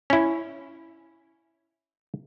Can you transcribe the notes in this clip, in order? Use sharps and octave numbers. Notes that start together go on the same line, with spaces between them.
C#4 E4